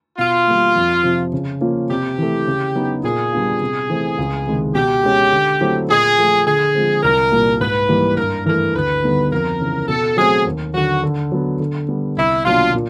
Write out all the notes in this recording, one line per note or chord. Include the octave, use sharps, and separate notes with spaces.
B2 F4
G3 A#3
F2
C3 F3
C#3
F3 A#3 C#4 F4
C3 G4
E3 A3
C#3
F#3 B3 D#4 F#4
A#2 G#4
G3 B3 D4 F4
C3
E3 A3 C4
C#2
C3 D#3 G#3
B2 G4
G#3 C#4
D3
F#3 A3 C4 E4
A#2 G#4
F3 A3
D3 G#4
F3 G#3 C4
C2 A#4
A#2 G3 A#3
G#2 B4
E3 G3 A#3
G2 A#4
E3 A3 A#4
D2 B4
D3 G3 B3 D#4
F2 A#4
C#3 E3
B2 A4
F#3 A3 C4 G#4
D#2
D3 F#3 F#4
D3
F#3 B3
D3
G3 B3
C2 E4
B2 F#3 A#3 D4 F4
A#2